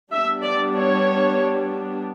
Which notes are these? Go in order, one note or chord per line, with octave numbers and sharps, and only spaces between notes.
G3 B3 D4 E5
D5
C#5